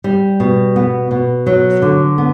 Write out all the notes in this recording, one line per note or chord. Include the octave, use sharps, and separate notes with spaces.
G3
B2
B3
B2
F#3
D3
B3